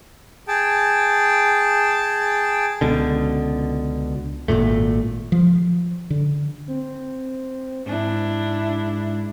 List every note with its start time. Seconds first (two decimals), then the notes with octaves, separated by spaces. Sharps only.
0.48 G#4 G5 A5
2.81 C#2 B2 D3
4.48 G#1 E2 A#2 A3
5.32 F3
6.10 D3
6.68 C4
7.86 G#2 D4 E4